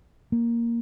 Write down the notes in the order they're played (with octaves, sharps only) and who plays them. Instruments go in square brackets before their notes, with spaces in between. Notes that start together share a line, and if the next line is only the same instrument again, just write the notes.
[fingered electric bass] A#3